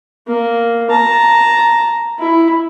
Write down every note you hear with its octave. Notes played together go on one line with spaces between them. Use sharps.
A#3
A5 A#5
E4